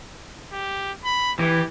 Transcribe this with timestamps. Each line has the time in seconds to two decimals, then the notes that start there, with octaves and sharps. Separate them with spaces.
0.53 G4
1.05 B5
1.39 E3 G4